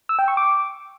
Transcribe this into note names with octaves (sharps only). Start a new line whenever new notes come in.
E6
G5
C#6
D6